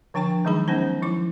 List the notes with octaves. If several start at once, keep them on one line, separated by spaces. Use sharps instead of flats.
D3 F3 D4 G5 G#5 C#6
D#3 F#3 G#3 D#4 G#4 B5
B3 C#4 D#4 C5
F3 E4 D6